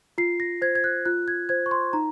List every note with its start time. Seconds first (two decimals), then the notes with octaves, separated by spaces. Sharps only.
0.18 F4 C7
0.40 A#6
0.62 C5 G#6
0.75 G#6
0.84 F#6
1.05 F4 F#6
1.28 G#6
1.49 C5 G#6
1.66 C#6
1.71 C6
1.93 D#4 A#5